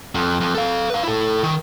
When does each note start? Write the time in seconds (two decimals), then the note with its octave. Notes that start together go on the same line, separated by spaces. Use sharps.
0.15 F2
0.40 F2
0.55 A4 F5
0.90 B4 F5
1.03 E4 A4
1.43 D#3